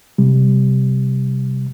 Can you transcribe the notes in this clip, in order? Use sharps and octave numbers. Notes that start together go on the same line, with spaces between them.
C3 G3